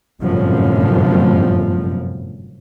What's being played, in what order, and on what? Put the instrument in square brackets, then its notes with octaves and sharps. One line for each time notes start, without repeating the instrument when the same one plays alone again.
[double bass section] G1 F#2 A2 C3 F3